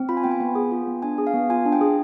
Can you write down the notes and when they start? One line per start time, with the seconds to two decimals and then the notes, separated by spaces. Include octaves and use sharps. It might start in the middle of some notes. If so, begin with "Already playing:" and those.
Already playing: C4
0.09 F4 B5
0.17 G#5
0.24 B3 G5
0.31 G#5
0.40 B3
0.55 G#4
0.71 F4
0.88 B3
1.02 D4 G#5
1.18 G#4
1.27 F5
1.34 B3
1.50 F4 G#5
1.66 D4
1.72 G5
1.81 G#4